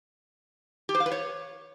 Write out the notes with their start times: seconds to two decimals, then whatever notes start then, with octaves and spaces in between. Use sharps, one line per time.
0.89 G4
0.95 C5
1.00 F5
1.06 B4
1.12 C#5